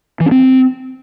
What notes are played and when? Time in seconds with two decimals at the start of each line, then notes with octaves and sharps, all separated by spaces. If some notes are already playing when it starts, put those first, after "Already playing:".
0.20 E3
0.26 C#4
0.31 C4